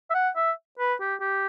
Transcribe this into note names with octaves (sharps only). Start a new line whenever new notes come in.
E5
F#5
E5
B4
G4
G4